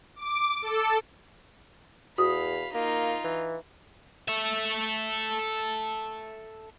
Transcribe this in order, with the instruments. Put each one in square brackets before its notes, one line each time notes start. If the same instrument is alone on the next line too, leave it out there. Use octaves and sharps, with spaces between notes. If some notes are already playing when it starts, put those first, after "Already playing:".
[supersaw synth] D6
A4
[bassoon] E2 [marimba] F#4 D#6 [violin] F5 B5
[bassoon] A#3 [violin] D#4 F4
[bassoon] E3
[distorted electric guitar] A4 E5